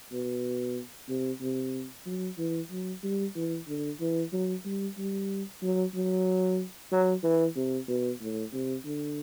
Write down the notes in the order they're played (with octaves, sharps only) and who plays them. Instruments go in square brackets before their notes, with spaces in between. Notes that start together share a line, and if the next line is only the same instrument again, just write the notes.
[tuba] B2
C3
C3
F#3
E3
F#3
G3
E3
D3
E3
F#3
G3
G3
F#3
F#3
F#3
E3
C3
B2
A2
C3
D3